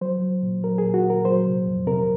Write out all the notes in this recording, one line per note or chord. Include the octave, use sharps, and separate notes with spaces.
F#3 C5
F#3
A#2
F#3 A#4
G#4
A#2
F#4
A#2 A#4
F#3 C5
C3
F2
C3 A#4